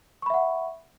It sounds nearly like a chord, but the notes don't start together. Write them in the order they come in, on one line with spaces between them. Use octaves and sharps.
C#6 B5 E5 F#5